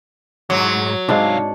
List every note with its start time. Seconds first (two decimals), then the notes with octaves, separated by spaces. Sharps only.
0.50 G#2 F#3
1.09 C2 G#2 C4 D4 D#4 D5 F5 A5